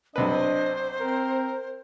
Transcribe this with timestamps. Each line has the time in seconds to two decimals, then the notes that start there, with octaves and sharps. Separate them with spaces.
0.16 B1 C3 D4 B4 C5 D#5
1.01 C4 A#4